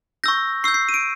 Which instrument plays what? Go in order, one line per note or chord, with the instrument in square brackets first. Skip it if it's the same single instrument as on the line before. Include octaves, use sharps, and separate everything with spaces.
[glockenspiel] C#6 E6 G6 A#6
C#6 E6 G6 C7
C7
D#7
D7